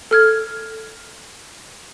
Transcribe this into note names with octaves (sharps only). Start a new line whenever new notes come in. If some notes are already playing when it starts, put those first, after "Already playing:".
A4 F6 G#6